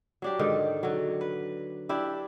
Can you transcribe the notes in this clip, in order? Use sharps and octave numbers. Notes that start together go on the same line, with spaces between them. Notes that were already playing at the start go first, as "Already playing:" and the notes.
F#3 D4 G4
G#2 D3 D#3
D3 F#3
B4
D4 E4 G4